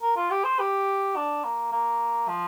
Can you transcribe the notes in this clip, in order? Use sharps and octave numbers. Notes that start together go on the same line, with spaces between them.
A#4
F4
G4
C5
G4
D4
A#3
A#3
F3